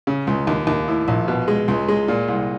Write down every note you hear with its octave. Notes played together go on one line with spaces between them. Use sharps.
C#3
C#2
D#2
D#2
A2
A#1
B2
G#3
C#2
G#3
A#2
C2